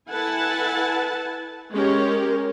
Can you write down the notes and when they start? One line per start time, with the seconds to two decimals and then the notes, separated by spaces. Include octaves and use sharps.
0.10 E4 A4 B4 F#5 G#5 A5
1.73 G#3 C#4 G4 A#4 C#5